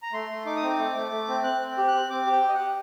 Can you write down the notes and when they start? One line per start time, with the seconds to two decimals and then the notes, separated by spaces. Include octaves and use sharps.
0.02 A#5
0.12 A3 C6
0.30 A3
0.46 D#4 D6
0.56 D#6
0.62 C4 D6
0.79 A3
0.95 A3
1.11 A3
1.28 C4
1.44 C4 F#6
1.61 C4
1.78 G4
1.88 F#6
1.94 C4
2.10 C4 D6
2.26 G4
2.32 G5
2.42 G4
2.48 D#5
2.54 F#5
2.60 G4